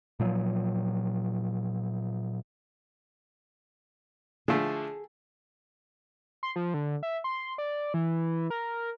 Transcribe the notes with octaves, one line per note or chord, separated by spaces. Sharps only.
A#2 F3 F#3
D3 F3 A3 G#4
C6
F3
D3
E5
C6
D5
E3
A#4